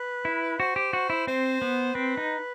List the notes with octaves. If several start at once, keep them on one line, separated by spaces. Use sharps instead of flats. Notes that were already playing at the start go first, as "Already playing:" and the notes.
Already playing: B4
E4
F#4 C5
G4
F#4
E4
C4 C5
B3
C4 B4
D#4